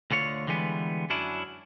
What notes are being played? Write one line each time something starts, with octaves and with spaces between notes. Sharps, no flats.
D2 D3 F4 C#5
D3 E3 G3 G#3 B3
F#2 F#3 C#4 D4 E4